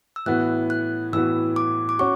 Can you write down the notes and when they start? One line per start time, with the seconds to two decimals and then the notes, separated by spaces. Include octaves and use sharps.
0.16 E6
0.26 A2 E3 B3 F#4 F#6
0.70 F#6
1.13 A2 E3 B3 F#4 E6
1.56 D6
1.89 D6
1.99 C#4 F#4 C#6